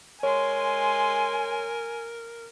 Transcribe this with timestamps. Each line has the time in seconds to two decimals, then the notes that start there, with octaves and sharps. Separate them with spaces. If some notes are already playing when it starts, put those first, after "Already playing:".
0.23 G#3 A#4 C#5 G#5 C6